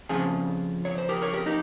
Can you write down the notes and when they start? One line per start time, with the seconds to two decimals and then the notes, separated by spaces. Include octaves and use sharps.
0.09 F2 C#3 F3 F4 G#4
0.85 C#5
0.98 C5
1.09 G4 A#4
1.22 A#4 C#5
1.34 G4 A#4
1.46 D#4 G4